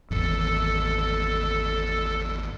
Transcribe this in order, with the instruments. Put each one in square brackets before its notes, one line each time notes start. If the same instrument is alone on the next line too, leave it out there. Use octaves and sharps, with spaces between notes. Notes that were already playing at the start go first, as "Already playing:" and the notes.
[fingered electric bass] G#1 E2 [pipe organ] A4